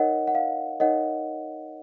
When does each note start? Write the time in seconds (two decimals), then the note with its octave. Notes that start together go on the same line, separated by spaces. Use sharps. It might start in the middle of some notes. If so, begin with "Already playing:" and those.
Already playing: D#4 A#4 C#5 D#5 F#5
0.28 F#5
0.35 F5
0.80 D#4 A#4 C#5 D#5 F#5